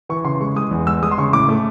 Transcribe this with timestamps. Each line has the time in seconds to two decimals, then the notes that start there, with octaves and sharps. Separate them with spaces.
0.09 E3 C#6
0.24 C#3 C6
0.41 G#3 C#6
0.56 G#3 D#6
0.71 E2
0.87 G#3 E6
1.03 G#3 D#6
1.11 C6
1.18 C#3 C#6
1.33 A2 D6
1.49 A3